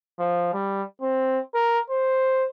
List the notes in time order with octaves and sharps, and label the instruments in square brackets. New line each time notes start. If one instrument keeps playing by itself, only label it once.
[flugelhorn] F3
G3
C4
A#4
C5